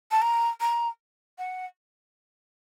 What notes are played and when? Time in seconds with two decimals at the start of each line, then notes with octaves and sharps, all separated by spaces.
0.11 A5
0.21 A#5
0.60 A#5
1.38 F#5